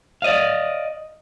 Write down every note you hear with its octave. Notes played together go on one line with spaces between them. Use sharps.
D5 D#5 F5